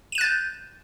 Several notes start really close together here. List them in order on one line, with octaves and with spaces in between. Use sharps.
D#7 E7 F#6 A6 G6